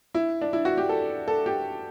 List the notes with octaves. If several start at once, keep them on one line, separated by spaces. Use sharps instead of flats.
E4
D4
E4
F#4
G4
A4
A4
G4